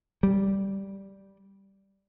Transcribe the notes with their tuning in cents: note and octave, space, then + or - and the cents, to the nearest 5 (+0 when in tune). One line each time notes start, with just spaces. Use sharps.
G3 -5